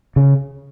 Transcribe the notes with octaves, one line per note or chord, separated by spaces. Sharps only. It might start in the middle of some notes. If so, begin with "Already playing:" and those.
C#3